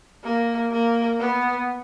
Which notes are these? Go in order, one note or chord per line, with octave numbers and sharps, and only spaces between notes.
A#3
A#3
B3